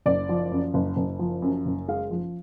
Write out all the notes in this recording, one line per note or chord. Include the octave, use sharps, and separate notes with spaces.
F#1 D5
F3
F#2
F#1
F#1
F3
F#2
F#1
G#3 F5
F3